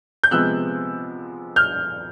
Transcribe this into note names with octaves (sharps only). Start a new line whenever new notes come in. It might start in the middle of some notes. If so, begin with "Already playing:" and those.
G6
C3 F3 G#3 B3 E6 F#6
F6 G6